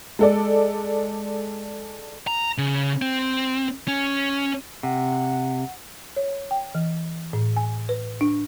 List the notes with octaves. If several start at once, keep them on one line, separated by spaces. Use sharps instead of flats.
G#3 A4 D5
A#5
C#3
C4
C#4
C3 F#5
C#5
G5
E3
A2
G#5
B4
D4